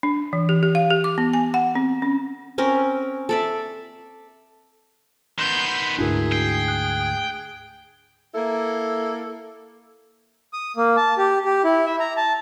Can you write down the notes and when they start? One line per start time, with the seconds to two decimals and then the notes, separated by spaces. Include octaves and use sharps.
0.03 D4
0.33 E3
0.49 G4
0.63 G4
0.75 F5
0.90 G4
1.04 D6
1.18 B3
1.33 G#5
1.54 F#5
1.75 C4
2.02 C#4
2.58 C4 C#4 A#4
3.29 A4 D5 E5
5.39 D#3 B3 C6 G6
5.99 D2 G#2 D4 E4 F#4 G#4 A#4
6.32 G5 C7
6.68 F#6
8.35 A#3 E4 A4
10.53 D#6
10.77 A#3
10.97 A5
11.18 G4
11.45 G4
11.65 E4
11.86 E5
12.00 A#5
12.17 A5